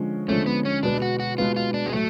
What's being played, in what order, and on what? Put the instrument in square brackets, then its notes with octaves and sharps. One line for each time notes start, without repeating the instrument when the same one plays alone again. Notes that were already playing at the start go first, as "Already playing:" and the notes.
Already playing: [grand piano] D3 F3 G#3 C#4
[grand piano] D3 F3 G#3 C#4 [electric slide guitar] A3
[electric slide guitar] B3
C#4
[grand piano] B2 G#3 B3 [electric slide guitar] D4
[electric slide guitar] F#4
F#4
[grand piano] B2 G#3 B3 [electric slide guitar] F4
[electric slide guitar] F4
D4
G#3
[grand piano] A2 F#3 [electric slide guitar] A3